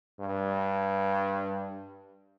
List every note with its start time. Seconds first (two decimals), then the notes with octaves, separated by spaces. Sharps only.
0.20 G2